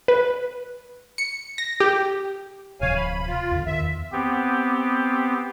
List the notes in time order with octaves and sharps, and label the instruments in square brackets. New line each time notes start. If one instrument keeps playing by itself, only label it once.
[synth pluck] B4
C#7
A#6
G4
[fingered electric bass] D1 C3 F3 [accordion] C#5 F5 G#5
[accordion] B5
F4
[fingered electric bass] E2 D3
[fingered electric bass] E2 D#3 [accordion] E5
[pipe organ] B3 C4 G4